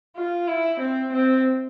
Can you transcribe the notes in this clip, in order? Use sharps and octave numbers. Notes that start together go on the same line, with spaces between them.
F4
E4
C4
C4